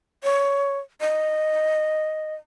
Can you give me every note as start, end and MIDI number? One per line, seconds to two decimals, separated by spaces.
0.23 0.79 73
1.01 2.35 75